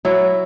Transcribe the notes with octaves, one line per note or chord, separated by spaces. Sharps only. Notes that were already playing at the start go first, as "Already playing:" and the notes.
F#3 E4